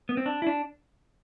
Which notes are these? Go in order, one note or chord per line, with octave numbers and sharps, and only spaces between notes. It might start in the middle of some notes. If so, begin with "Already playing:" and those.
B3
C4
D4
E4
D4